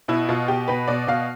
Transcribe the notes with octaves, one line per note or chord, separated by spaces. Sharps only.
B2 E4
B2 F4
B2 G4
B2 B4
B2 D5
B2 F5